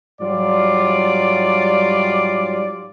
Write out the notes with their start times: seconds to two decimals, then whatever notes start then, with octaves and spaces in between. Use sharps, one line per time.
0.21 G#2 F#3 G3 F4 D5